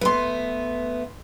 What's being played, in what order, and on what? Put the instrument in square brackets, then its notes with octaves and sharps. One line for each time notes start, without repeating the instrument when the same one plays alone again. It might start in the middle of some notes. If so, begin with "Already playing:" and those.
[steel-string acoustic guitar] A3 B3 [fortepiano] B4 C6